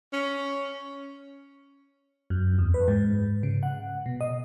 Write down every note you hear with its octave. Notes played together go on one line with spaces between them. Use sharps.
C#4
F#2
E2
B4
G#2
C#3
F#5
B2
D#5